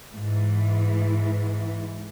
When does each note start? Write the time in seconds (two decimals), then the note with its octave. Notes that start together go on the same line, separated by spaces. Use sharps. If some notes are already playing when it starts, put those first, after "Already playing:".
0.13 G#2 E3